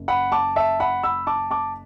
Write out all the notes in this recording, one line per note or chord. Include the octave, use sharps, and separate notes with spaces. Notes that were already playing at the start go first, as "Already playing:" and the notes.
Already playing: F#1
F#5 B5
A5 D6
E5 A5
F#5 B5
B5 E6
A5 D6
A5 D6